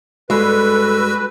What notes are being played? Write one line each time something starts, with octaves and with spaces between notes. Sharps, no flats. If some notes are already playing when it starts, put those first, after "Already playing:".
G2 G#3 F#4 A4 B4 E6